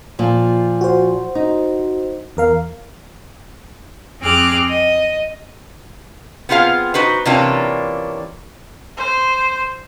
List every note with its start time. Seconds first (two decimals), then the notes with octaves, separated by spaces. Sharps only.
0.19 A#2 F3
0.81 F#4 C5
1.35 D#4
2.37 E2 A#4 F5
4.21 F2 C4 G#4 D6 F6 F#6
4.68 D#5
6.49 B3 C4 F4 G#4 F5
6.94 D#4 F#4 B4 C5
7.25 C3 E3 A#3 C#4 D4 F4
8.97 C5